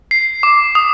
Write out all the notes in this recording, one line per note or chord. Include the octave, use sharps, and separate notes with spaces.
C7
D6
D#6